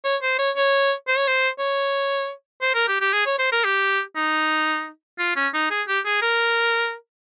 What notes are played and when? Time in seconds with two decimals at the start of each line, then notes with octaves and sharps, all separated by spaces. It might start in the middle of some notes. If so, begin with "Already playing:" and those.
0.04 C#5
0.22 C5
0.39 C#5
0.56 C#5
1.08 C5
1.17 C#5
1.28 C5
1.59 C#5
2.62 C5
2.75 A#4
2.88 G4
3.01 G4
3.13 G#4
3.26 C#5
3.39 C5
3.52 A#4
3.65 G4
4.16 D#4
5.19 F4
5.36 C#4
5.54 D#4
5.70 G#4
5.88 G4
6.05 G#4
6.22 A#4